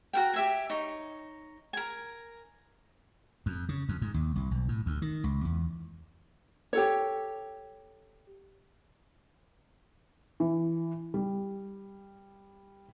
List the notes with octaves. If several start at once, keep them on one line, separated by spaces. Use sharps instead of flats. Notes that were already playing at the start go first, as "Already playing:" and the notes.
F#4 A#4 G5
G4 E5 G#5
D#4 C#5
A#4 G#5
F2
C#3
F2
G#2
D#2
C2
B1
A2
D2
D#3
C#2
E2
G4 A4 C#5
E3
G3